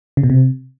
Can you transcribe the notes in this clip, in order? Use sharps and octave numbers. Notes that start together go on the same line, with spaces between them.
C#3
B2
C3